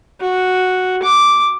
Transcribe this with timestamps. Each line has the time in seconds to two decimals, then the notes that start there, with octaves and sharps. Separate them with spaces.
0.21 F#4
1.03 D6